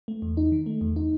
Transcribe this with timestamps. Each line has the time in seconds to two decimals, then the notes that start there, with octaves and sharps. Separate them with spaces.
0.08 A3
0.22 E2
0.37 D#4
0.52 D#3
0.66 A3
0.81 E2
0.96 D#4